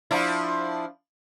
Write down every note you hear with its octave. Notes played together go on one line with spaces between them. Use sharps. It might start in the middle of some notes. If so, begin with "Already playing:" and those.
F3 D4 E4